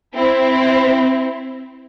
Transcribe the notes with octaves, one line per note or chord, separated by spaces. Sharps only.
C4 E4